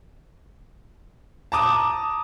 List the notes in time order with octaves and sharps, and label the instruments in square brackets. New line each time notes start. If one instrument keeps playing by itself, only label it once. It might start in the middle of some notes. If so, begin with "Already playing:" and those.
[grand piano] A5 A#5 D6 D#6